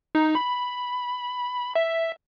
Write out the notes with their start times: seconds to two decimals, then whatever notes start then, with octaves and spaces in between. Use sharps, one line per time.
0.15 D#4
0.35 B5
1.75 E5